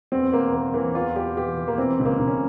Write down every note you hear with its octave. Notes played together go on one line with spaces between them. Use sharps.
E2 C4
E2 A#3
E3 A#3
E3 A#3
E2 F4
E2 G4
E3 G4
E3
A#3
E3 C4
C#2
A#3
C#2
C#4